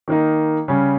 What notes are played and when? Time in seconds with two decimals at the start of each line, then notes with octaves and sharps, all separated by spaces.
0.08 D#3 A#3 D#4
0.68 C#3 G3 C#4